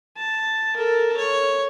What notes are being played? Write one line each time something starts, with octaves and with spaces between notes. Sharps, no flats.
A5
A4 A#4
C#5